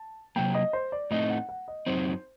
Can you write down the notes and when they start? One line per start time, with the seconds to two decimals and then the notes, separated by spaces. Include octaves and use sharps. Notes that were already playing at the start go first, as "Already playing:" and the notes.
Already playing: A5
0.36 C3 F#3 A#3 G5
0.55 D#5
0.73 C5
0.92 D5
1.11 A2 A3 C4 D#4 D#5
1.30 F#5
1.49 F#5
1.68 D#5
1.86 F#2 F#3 C4 D#4 C5